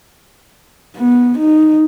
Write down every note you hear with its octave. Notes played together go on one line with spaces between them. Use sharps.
B3
D#4